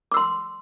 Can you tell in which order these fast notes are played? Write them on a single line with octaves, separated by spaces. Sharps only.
D6 E6 C6